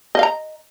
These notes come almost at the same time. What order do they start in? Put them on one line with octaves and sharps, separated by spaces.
D#5 F5 A#5